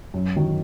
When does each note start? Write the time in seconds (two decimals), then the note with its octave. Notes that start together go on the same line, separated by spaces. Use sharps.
0.14 F#2
0.36 D#3 F#3